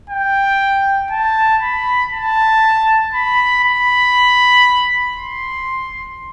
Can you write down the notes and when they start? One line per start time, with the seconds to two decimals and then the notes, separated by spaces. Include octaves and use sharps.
0.10 G5
1.11 A5
1.62 B5
2.12 A5
3.14 B5
3.64 B5
5.16 C6